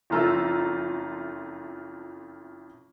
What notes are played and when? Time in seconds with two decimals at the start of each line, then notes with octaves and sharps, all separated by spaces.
0.10 F#1 F2 A3 F4 A#5 E6